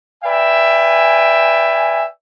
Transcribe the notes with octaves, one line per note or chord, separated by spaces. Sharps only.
B4 D5 E5 G5 G#5